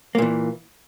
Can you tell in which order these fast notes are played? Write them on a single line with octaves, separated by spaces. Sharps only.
A#3 A#2 E3